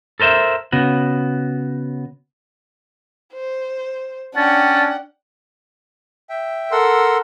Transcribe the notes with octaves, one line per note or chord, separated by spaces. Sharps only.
A4 A#4 C5 D#5 E5
C#3 B3 F#4
C5
C#4 D4 F#5 G5 A5
E5 G5
A4 A#4 F#5 C6 E6